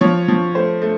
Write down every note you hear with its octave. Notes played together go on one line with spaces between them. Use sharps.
F3 C#5
F3
A3 C5
A3